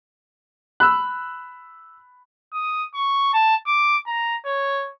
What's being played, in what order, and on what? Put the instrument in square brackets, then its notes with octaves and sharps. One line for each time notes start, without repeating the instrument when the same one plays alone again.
[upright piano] B5 [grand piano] E6 F#6
[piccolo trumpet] D#6
C#6
A5
D6
A#5
C#5